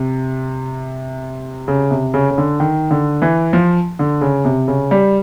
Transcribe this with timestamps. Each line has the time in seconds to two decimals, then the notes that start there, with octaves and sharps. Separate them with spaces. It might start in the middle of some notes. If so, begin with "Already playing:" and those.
Already playing: C3
1.68 C#3
1.91 C3
2.14 C#3
2.31 C#3
2.38 D3
2.60 D#3
2.91 D3
3.22 E3
3.53 F3
3.99 D3
4.21 C#3
4.45 C3
4.68 C#3
4.91 G3